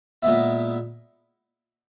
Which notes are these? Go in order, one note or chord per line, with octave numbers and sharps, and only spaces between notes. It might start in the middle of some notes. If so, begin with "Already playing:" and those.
A#2 G#3 B3 E4